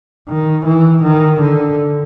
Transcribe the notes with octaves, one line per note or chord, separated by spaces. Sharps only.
D#3
E3
D#3
D3